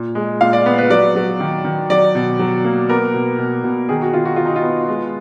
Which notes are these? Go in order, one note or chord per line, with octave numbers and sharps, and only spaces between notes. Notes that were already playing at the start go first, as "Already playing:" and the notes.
Already playing: A#2
G#3
A#2 F5
D5
B3
B4
F#3 D5
F#3
D#3
D#3
F#3 D5
B2
F#3
A#3
B3 A#4
B2
B2
B2
D#3 G#4
F#4
D#3 F4
F#4
D#3 F4
D#4
F4
B3
G#3